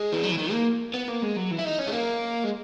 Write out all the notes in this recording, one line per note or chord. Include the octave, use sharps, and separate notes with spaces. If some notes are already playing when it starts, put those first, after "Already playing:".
Already playing: G#3
E3
F#3
E3
D#3
A#3
B3
A#3
G#3
F#3
E3
E4
D#4
C#4
G#3
A#3
G#3